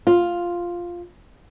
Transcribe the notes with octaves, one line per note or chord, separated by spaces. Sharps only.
F4